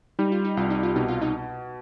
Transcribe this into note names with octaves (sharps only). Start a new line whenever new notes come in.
G3 D#4
F4
D#4
C2 F4
D#4
F4
B2 D#4
F4
D#4